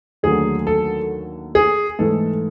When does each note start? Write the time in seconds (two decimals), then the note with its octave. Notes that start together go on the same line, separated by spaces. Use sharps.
0.23 D#2 D3 F#3 A3 G#4
0.67 A4
1.55 G#4
1.99 G#2 E3 A3 A4